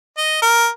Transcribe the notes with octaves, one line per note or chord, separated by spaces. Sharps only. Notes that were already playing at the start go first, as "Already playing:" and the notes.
D#5
A#4